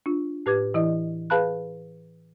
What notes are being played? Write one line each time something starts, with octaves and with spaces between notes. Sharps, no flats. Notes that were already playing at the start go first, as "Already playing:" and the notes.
D4 F4
A2 G4 B4 D6 G#6
E3 E4 D5 D#5
G#4 B4 F5 A5 B5 F#6